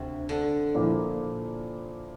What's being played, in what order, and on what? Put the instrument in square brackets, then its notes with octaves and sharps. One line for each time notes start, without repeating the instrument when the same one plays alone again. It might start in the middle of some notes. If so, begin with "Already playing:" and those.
Already playing: [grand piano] D2 [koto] C3
[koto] D3
[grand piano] A#2 F3 A#3 E4